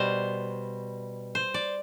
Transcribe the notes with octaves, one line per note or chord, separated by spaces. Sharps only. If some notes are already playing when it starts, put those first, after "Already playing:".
Already playing: B2 G3 C5
C5
D5